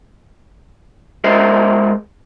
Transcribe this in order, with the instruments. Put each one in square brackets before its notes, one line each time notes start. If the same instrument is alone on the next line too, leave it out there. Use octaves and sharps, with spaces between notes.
[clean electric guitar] G#3 G#4 A#4 C5 D#5 E5